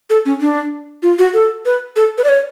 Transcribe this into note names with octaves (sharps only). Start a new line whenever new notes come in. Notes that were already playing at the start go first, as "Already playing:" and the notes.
A4
C#4
D4
F4
F#4
A4
B4
A4
B4
D5
C#5